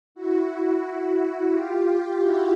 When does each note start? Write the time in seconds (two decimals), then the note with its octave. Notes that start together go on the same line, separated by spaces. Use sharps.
0.15 E4 F#4
1.51 F4 G4
1.85 F4 G4
2.19 E4 F#4